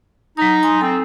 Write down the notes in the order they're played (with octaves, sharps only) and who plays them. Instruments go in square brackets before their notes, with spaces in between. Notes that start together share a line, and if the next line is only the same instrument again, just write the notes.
[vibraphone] F#3 D#6 [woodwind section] D#4
[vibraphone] G#5 C6 D#6
[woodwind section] C4 [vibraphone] A4